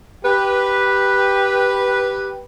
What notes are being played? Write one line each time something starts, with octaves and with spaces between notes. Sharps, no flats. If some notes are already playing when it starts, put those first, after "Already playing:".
G4 B4